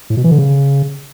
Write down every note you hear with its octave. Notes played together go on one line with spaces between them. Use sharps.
A2
B2
E3
D3
C#3